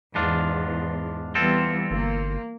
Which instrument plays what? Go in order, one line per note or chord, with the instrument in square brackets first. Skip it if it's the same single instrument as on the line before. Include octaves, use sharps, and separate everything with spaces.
[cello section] E2 [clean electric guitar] G#2 D4 F4
[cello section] E3 G3 B3 [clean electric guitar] C4 F4 A4
[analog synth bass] G1 [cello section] A#3